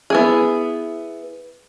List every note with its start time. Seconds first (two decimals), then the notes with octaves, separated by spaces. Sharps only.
0.10 B3 E4 G#4